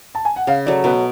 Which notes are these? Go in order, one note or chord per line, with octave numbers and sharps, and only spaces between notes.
A5
G#5
F#5
C#3 F5
F#3 A3 D5
B2 B4